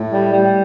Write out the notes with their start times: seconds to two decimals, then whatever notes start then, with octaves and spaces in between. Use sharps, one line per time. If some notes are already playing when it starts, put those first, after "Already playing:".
Already playing: A2
0.11 G3
0.32 G3